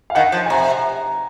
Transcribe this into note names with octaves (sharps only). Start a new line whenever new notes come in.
F5
D#3 F#5
F3
G#5
C3 A#5